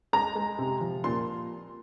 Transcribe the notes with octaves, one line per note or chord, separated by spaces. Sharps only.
G#3 A#5
G#3
C3
F3
A#2 C6